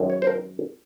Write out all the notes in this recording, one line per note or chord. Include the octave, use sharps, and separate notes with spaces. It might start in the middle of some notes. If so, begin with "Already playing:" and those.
Already playing: F#2 D#3 G#3
C#5
C5
A#4